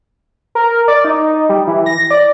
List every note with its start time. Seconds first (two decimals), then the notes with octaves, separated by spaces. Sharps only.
0.55 A#4
0.88 D5
1.05 D#4
1.49 G3
1.67 E3
1.86 A#6
2.11 D5